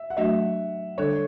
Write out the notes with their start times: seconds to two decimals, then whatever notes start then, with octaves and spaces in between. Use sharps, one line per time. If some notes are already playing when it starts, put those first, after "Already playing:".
Already playing: E5
0.10 F#5
0.17 F#3 A3 D4 F#4 E5
0.98 D3 G3 D4 A4 C#5